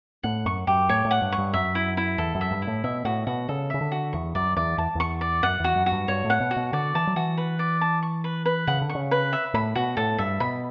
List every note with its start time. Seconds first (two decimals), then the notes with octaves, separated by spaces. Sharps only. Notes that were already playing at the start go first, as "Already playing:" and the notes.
0.23 A2 F#5
0.45 F#2 C#6
0.67 F#2 G4
0.89 A2 C#5
1.05 A2
1.11 F#5
1.22 G2
1.32 C#6
1.38 G2
1.53 F#2 E5
1.75 E4
1.97 E4
2.18 E2 A4
2.35 F#2
2.41 E5
2.51 G2
2.62 E4
2.67 A2
2.84 B2 E5
3.05 A2 F#4
3.27 B2 F#4
3.49 C#3 A4
3.70 C#3 E5
3.81 D3
3.92 F#4
4.13 E2 C#6
4.35 F#2 D5
4.56 E2 D5
4.78 E2 A5
4.95 E2 C#6
5.21 D5
5.43 F#2 F#5
5.60 E2 F#4
5.75 F#2
5.86 F#4
5.92 G2
6.08 G2 C#5
6.24 A2
6.30 F#5
6.40 B2
6.51 F#4
6.57 B2
6.73 D3 D5
6.95 E3 A5
7.07 F#3
7.16 E3 F#4
7.38 B4
7.59 D5
7.81 A5
8.03 C#6
8.24 B4
8.45 B4
8.67 C#3 F#5
8.82 D3
8.90 C#6
8.95 C#3
9.11 B4
9.33 E5
9.54 A2 B5
9.75 B2 F#4
9.97 A2 A4
10.18 G2 E5
10.40 B2 B5